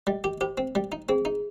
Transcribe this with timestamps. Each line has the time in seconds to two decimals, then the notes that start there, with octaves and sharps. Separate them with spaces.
0.07 G3 D#5
0.24 G4
0.41 G4 C5
0.58 C4
0.75 G3
0.92 D#4
1.09 C4 G#4
1.25 D#4